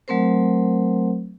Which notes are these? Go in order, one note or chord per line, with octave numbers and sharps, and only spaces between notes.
F#3 A3 C4 A#4 C5